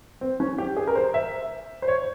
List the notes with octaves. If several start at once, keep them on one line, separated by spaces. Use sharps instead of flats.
C4
C#4
G4
G#4
A#4
C5
E5
C5
C#5